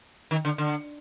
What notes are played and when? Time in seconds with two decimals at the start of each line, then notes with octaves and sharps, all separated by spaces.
0.31 D#3
0.45 D3
0.58 D3